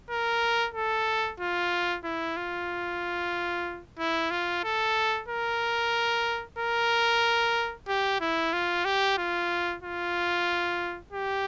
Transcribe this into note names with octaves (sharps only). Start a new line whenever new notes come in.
A#4
A4
F4
E4
F4
E4
F4
A4
A#4
A#4
G4
E4
F4
G4
F4
F4
G4